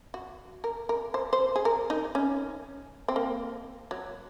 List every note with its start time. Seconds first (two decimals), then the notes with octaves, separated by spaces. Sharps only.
0.14 F#4
0.64 A#4
0.89 A#4
1.14 C5
1.33 C5
1.56 G#4
1.65 A#4
1.90 D#4
2.15 C#4
3.08 C4
3.16 A#3
3.91 F#3